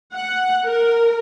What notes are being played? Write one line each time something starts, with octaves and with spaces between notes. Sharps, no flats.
F#5
A#4